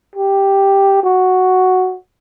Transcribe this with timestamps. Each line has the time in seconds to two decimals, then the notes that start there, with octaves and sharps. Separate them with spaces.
0.15 G4
1.04 F#4